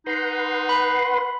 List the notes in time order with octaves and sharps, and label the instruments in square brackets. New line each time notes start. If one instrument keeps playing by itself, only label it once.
[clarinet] D#4 [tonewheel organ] B4 F#5 C6
[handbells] B5